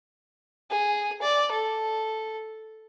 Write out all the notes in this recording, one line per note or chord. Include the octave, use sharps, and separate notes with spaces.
G#4
D5
A4